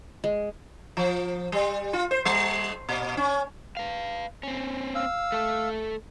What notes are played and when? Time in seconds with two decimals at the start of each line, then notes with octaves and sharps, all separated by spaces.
0.24 G#3
0.97 F3
1.52 G3
1.93 F4
2.11 C5
2.25 G3
2.89 A#2
3.17 C#4
3.77 B4 F5
4.43 C4 C#4
4.95 F5 E6
5.32 A3 A4